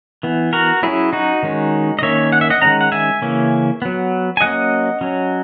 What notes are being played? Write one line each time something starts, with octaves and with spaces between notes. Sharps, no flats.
E3 B3
F#4 A#4
F#3 C#4 E4 G#4
D#4 F#4
D#3 G#3 C#4
D#5
D#3 A#3 C#4 C#5 E5
F#5
E5
D#5 F#5
D#3 G#3 C#4 F#5 A#5
F#5
E5 G#5
C#3 E3 A#3 C#4
F#3 B3
G#5
F#3 A#3 C#4 D#5 F#5
F#3 C#4